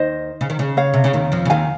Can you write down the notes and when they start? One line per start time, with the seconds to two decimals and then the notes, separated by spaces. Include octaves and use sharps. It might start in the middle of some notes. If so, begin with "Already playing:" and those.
Already playing: D#2 D#3 C5 D#5
0.41 C#3
0.50 D#3
0.59 C#3
0.77 C#5 F5
0.94 C3
1.04 C#3
1.13 D#2 D#3
1.32 F2 F3
1.45 C#3
1.50 D#2 D#3 F5 G#5